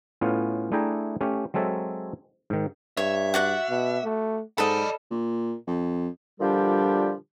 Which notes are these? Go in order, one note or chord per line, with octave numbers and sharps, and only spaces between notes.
A2 B3 C#4 F4
A3 D4 E4 G#4 G5 A#5
A3 C#4 G4
F#3 G#3 C4 A4 C#5 E5
G#2 D#3
G2 C#5 E5
F#4 D5 F#5
B2
A3
G#2 A4 D5 D#5 B5
A#2
F2
A#2 D3 F3 G3 D4 G4